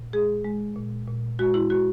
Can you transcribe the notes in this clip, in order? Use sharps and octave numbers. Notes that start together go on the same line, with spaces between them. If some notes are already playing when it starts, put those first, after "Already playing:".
Already playing: A#2
G#3 G#4
G#3
A#2
A#2
G#3 F#4
E4
G#3 F#4